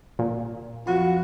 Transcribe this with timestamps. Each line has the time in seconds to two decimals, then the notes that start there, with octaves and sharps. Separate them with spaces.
0.19 A#2
0.87 F2 F#3 F4 F#4 B5